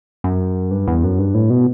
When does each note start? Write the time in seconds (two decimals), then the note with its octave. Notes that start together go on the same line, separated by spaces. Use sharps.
0.24 F#2
0.71 G2
0.88 E2
1.04 F#2
1.19 G2
1.34 A2
1.50 B2